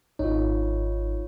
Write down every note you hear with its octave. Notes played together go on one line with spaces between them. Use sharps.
G#1 D#4 F4 C#5